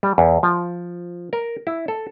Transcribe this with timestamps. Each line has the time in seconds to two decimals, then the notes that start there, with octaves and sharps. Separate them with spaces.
0.03 G3
0.18 E2
0.43 F3
1.33 A#4
1.67 E4
1.88 A4